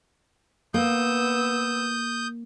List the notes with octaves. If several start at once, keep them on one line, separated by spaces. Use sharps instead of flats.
A#3 B3 D#6 E6 G6